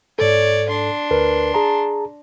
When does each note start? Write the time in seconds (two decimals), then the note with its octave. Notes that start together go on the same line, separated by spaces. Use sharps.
0.19 G#2 A4 C#5 D5
0.69 D4 C6
1.11 D2 A#4 B4
1.54 G#4 A5 A#5